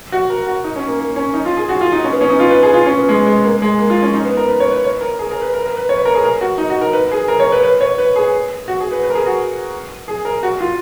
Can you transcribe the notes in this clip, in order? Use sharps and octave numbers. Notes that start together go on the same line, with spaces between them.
F#4
A#4
F#4
D#4
C#4
A#3
A#3
C#4
D#4
F4
G#4
F#4
F4
D#4
C#4
B3
C#4
D#4
F4
B4
G#4
F4
C#4
B3
G#3
G#3
A#3
G#3
A#3
F4
C#4
D#4
B3
A#4
B4
C#5
B4
C#5
A#4
G#4
A#4
B4
A#4
A#4
B4
C#5
B4
A#4
G#4
A#4
F#4
D#4
F#4
A#4
B4
G#4
A#4
C#5
B4
B4
C#5
B4
G#4
F#4
G#4
B4
B4
A#4
G#4
F#4
G#4
A#4
F#4
F4